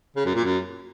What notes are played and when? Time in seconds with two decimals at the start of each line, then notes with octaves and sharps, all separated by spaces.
0.16 C#3
0.25 F#2
0.35 A#2
0.44 F#2